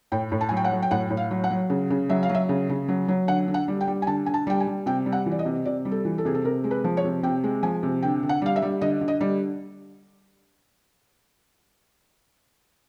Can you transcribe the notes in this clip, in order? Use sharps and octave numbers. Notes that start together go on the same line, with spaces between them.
A2 G5
A2
A5
F#3 G#5
G5
F#5
F#3
G5
A2 F#5
A2
F5
F#3
F#5
F#3
C#3
C#3
F#3 E5
F5
F#3
E5
C#3
C#3
F#3
F#3
D3 F#5
D3
F#5
G3
G5
G3
G#5
D3 A5
D3 G#5
A5
G3 G5
G#5
G3
C3 G5
G3
F#5
E3
D5
D#5
C3
C3 D5
G3
A4
E3
A4
C3 G#4
A4
C3 A#4
G#3
B4
F3
C#5
C3
C3 G5
G#3
F3 G#5
C3
D3 G5
D3
F#5
G3 F5
E5
G3
D3 D#5
D3
D#5
G3